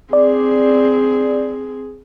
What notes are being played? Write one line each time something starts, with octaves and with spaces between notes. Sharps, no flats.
C4 G#4 D5